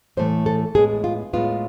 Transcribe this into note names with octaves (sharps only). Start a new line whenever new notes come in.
A2 E3 A3 C5
A4
A2 G#3 B3 G#4
F4
A2 G#3 B3 F4